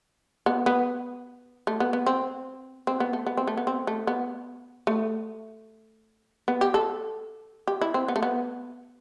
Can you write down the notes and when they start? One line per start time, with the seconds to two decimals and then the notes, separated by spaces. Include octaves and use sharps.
0.46 B3
0.66 B3
1.67 A3
1.80 B3
1.93 B3
2.07 C4
2.87 C4
3.00 B3
3.13 A3
3.27 B3
3.37 C4
3.47 A3
3.57 B3
3.67 C4
3.87 A3
4.07 B3
4.87 A3
6.48 B3
6.61 G4
6.74 A4
7.67 G4
7.81 E4
7.94 C4
8.08 B3
8.16 A3
8.23 B3